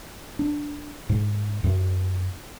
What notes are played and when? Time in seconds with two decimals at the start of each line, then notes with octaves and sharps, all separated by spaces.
0.39 D4
1.09 G#2
1.64 F#2